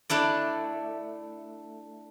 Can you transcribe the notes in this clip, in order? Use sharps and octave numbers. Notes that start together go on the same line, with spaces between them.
A3 D4 E4 D5